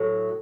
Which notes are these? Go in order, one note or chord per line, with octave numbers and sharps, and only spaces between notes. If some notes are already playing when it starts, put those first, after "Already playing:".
Already playing: A2 F#3